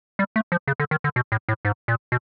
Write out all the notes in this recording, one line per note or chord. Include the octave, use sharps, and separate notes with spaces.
G3
A3
F3
C#3
D3
D#3
D3
B2
A2
A2
G#2
A#2
B2